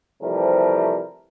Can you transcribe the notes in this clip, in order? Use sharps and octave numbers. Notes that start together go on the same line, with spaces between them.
C3 E3 F3 G3 A3 A#4